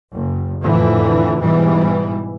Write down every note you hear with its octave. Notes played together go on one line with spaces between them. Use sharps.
F#1
F2 A2 D3 E3
G#2 B2 E3 G3